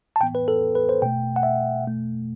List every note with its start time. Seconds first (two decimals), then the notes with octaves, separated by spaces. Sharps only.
0.16 A5
0.20 A2 E3 B3 G5
0.35 B4
0.48 A4
0.75 B4
0.89 C5
1.02 B2 A3 G5
1.36 F#5
1.43 E5
1.84 B2 A3